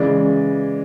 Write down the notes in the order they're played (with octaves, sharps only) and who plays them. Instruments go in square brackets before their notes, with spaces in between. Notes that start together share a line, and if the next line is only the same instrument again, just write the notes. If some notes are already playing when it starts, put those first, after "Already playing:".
Already playing: [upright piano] C#3 E3 G#3 D5